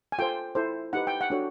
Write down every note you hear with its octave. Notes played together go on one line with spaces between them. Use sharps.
G#5
F4 A4 C5 G5
E4 A4 C5
D#4 G4 B4 F#5
G5
F#5
D4 F#4 A4 C#5